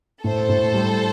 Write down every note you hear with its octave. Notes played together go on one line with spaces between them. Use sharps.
A2 A4 C5
A2
G3